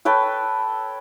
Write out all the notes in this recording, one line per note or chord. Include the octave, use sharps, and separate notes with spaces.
A4 B4 C#5 G5